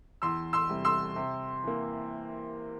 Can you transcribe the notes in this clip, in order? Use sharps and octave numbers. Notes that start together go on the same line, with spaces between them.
E2 C6 E6
C6 E6
C3 G3
C6 E6
C3
E3 A#3